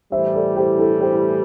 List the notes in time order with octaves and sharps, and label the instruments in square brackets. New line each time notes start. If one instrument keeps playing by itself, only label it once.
[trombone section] A2 E3 G3 [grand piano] C5 E5
[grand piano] A4 D5
G4 C5
E4 A4
G4 C5